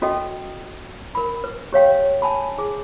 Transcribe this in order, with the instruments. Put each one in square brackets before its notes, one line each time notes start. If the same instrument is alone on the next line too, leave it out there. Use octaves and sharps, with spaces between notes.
[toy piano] C#4 F#4 A4 D#5 G5
A#4 B5
B4
G4 C#5 F5 G5
G#5 A5 B5
G#4